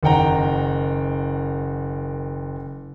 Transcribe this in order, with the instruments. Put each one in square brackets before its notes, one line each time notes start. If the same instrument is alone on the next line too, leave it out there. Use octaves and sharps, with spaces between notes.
[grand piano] F#1 D#3 F#5 G5 A#5